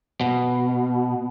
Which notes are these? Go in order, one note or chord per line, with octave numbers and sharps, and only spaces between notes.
B2